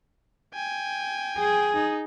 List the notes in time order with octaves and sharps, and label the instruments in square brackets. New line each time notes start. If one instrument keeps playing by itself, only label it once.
[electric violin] G5 G#5
[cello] G#4
[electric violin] D#4